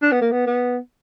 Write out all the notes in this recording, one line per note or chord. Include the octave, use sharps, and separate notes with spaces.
D4
B3
A#3
B3
B3